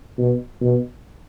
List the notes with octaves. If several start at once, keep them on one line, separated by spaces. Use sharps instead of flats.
B2
B2